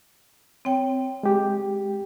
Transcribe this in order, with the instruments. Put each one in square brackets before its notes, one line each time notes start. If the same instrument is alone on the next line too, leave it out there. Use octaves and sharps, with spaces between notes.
[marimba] C4 C#5 G5
[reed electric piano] G#3 G4